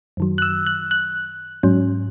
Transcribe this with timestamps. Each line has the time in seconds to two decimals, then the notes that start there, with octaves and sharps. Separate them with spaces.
0.17 F#2 D#3 F#3
0.38 F#6
0.42 E6
0.67 F#6
0.91 F#6
1.63 G#2 F#3 C#4